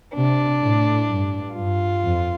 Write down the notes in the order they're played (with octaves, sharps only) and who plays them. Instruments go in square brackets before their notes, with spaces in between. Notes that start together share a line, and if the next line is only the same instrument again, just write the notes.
[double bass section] C3 [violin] D4
[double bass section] A2
G2
[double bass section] G2 [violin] F4
[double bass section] F2